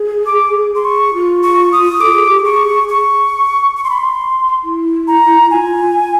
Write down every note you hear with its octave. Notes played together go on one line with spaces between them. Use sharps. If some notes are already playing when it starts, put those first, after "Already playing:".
Already playing: G#4
D6
C6
C#6
F4
C#6
D#6
A4 D6
G#4
G4
G#4 C#6
C#6
C#6
C6
B5
C6
E4
A#5
F4 G#5